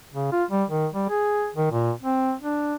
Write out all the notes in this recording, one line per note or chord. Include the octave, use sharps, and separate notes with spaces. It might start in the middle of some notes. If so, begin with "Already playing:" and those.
C#3
F4
G3
D#3
G3
G#4
D#3
A#2
C4
D4